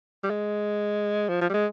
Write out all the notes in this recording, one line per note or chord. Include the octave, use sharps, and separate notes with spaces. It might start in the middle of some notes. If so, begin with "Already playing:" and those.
G3
G#3
F3
F3
G3
G#3